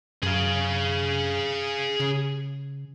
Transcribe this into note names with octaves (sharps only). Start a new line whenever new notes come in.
F#2 G#4 F5
C#3